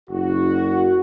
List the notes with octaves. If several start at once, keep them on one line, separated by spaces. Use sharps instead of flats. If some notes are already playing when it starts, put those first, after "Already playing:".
F#1 F#4